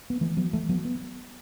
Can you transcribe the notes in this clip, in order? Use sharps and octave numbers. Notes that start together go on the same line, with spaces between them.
B3
E3 A3
F#3 B3
E3 A3
F#3 B3
B3